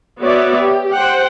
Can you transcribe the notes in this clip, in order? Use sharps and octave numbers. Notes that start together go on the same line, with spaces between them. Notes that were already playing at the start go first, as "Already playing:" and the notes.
B3 F#4 C#5 D5 E5
G4
C5 F#5 G5